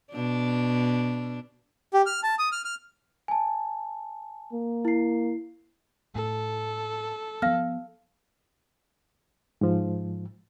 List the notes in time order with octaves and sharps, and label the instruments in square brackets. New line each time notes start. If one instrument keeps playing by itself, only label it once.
[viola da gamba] B2 D4
[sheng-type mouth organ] G4
F6
A5
D#6
F6
F6
[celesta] G#5 A5
[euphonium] A#3
[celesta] E4 C7
[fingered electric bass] A2 [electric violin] A4
[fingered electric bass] F3 B3 [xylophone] F5 F6
[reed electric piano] G#2 F3